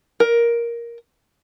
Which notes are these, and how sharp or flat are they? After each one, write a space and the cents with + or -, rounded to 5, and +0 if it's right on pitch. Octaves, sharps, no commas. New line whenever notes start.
A#4 +10